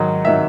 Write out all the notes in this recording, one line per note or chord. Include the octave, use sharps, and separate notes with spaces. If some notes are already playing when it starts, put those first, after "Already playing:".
Already playing: G#2 D#3 F#3
D#3 F#3 E5